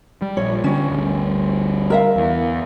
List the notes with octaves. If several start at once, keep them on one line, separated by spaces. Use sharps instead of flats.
G3
A#1 C#5
D3 F#3 G3 C#4
G1 D2 G2
A#4 E5 F5
E2